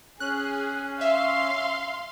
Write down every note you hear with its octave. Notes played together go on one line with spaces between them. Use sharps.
C#4 G#4 F#6
E5 F5 C6